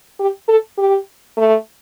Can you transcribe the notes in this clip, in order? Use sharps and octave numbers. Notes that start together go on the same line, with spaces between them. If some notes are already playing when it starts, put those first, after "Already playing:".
G4
A4
G4
A3